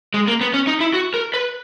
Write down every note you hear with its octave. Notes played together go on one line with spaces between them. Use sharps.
G#3
A#3
B3
C#4
D#4
E4
F#4
A#4
B4